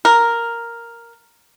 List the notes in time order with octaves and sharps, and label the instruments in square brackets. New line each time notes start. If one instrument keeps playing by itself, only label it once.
[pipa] A#4